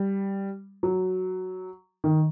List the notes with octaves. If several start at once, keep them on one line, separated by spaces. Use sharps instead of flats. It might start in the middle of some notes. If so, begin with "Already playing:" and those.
Already playing: G3
F#3
D#3